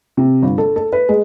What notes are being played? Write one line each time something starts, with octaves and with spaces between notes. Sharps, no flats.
C3
G1
A4
A4
B4
G#3